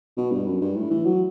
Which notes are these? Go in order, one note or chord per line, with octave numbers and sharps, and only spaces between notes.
B2
G2
F#2
G2
A2
E3
F#3